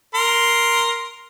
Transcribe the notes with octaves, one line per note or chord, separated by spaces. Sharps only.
A#4 C6